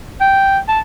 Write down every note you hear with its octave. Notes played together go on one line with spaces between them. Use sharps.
G5
A5